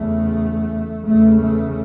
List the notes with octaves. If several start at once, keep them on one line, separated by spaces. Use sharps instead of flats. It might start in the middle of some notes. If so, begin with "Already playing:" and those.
Already playing: E2 C#3 A3
E2 C#3 A3
A3